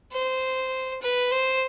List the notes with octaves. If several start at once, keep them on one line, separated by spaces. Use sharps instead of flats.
C5
B4
C5